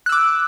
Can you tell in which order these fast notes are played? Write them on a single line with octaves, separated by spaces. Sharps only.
F#6 E6 D6